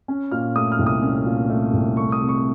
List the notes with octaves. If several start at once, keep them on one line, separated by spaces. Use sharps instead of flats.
C#4
A#2 F6
A3 D#6
F6
C2
D#6
C#4
A#2
A3
C2
A3 C#6
D#6
C3
C#6